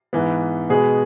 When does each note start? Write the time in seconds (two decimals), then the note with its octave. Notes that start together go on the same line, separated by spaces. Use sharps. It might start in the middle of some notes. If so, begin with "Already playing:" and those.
0.13 G#2 E3 B3
0.70 B2 G#3 B3 G#4